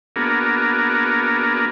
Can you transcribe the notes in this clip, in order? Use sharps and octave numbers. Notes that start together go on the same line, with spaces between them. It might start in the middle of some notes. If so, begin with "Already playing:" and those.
A#3 B3 D4 F#4 G#4 A#4